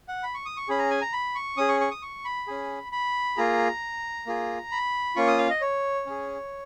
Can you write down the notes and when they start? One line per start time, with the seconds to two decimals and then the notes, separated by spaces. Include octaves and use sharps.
0.08 F#5
0.23 B5
0.34 C#6
0.46 D#6
0.57 C#6
0.69 C#4 G#4 B5
0.79 A#5
0.90 G#5
1.02 A#5
1.13 B5
1.35 C#6
1.57 C#4 G#4 D#6
1.69 C#6
1.81 C#6
1.91 D#6
2.02 C#6
2.25 B5
2.47 C#4 G#4
2.92 B5
3.37 A#3 F4 G#4 A#5
4.27 A#3 F4 G#4
4.71 B5
5.16 A#3 C#4 F4 C#6
5.28 D#6
5.38 F5
5.50 D#5
5.61 C#5
6.06 C#4 G#4